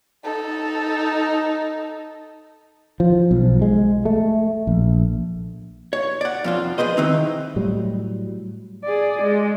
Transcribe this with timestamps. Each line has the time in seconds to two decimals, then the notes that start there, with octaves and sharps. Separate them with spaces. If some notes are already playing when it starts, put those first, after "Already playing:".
0.24 D#4 A4
3.00 F3
3.31 B1
3.62 G#3
4.05 A3
4.67 A#1
5.93 C#5
6.21 D5 F#5
6.44 F2 F3 F4
6.78 G#4 B4 C5 D#5
6.97 D#3 E3 C4 D#4
7.56 A2 F#3 G3
8.84 G#4 D5
9.23 G#3